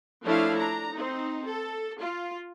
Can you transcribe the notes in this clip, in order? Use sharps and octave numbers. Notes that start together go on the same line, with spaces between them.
F3 A3 D4 E4 C#5 F5
D4 A#5
C4 D#4
A4
F4